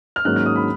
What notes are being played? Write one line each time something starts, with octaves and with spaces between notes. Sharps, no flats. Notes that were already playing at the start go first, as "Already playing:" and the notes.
F6
G#2 D#3 F#3 A#3 C#4 F#6
F6
D#6
B5